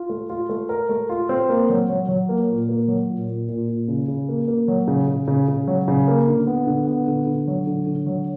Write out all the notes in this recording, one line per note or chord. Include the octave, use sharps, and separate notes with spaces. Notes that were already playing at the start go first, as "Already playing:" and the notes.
Already playing: F4
A3
F4
A3
A#4
A3
F4
C4
A#3
F#3
F#3
F#3
A#3
A#2
A#3
F#3
A#2
A#2
A#2
A#2
C#3
C#3
A#3
A#3
F#3
C#3
C#3
C#3
C#3
F#3
C#3
A#3
D3
B3
D3
B3
D3
D3
F#3
D3
D3
F#3